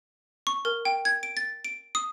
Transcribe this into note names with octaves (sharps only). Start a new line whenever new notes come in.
C#6
A#4
G5
G#6
D7
A6
D7
D#6